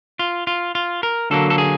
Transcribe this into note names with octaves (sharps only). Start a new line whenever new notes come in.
F4
F4
F4
A#4
D3 F#3 A#3 A4
A4
G#4